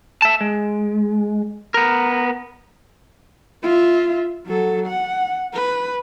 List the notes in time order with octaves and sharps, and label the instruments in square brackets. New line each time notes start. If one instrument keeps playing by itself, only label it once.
[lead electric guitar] E5 A5
G#3
B3 A#4
[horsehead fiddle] F4 E5
F#3 A4
F#5
B4